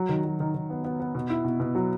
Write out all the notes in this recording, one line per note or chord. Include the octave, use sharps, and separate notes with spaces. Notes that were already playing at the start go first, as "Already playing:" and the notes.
Already playing: F#3
D#3
F#3
D#3
D#3
B3
B3
B3
B2
E4
B2
B2
F#3